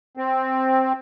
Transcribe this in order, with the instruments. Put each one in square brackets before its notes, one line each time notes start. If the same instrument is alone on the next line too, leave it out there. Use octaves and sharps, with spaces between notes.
[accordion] C4